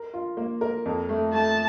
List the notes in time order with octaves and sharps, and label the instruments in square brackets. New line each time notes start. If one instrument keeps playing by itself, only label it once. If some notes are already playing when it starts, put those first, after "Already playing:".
Already playing: [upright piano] A#4
F4
A#3
A#4
F2
A3
[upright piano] A3 [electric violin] A5